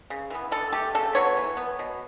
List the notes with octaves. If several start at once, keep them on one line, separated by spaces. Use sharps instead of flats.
C#3
E3 B3
D3 A4
A3 G4
C#3 A4
F#3 B3 C#5
E3
B3
B2